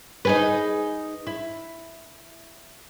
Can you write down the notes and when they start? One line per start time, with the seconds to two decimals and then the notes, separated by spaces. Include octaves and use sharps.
0.25 D#4 G#4 B4
1.27 E4